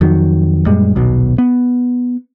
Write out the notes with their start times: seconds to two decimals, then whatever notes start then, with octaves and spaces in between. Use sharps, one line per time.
0.01 F2 D#3 F#3
0.66 F#2 A#2 G3 G#3
0.95 D#1 B1 B2
1.38 B3